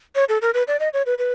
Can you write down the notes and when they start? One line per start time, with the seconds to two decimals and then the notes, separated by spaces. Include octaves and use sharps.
0.15 C#5
0.29 A4
0.42 A#4
0.54 B4
0.68 D5
0.80 D#5
0.93 C#5
1.06 B4
1.18 B4